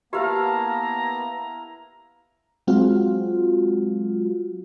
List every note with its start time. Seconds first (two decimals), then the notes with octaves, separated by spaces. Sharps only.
0.13 A#3 B3 E4 G4 F5 A5 A#5
2.67 F#3 G#3 C4 F4 F#4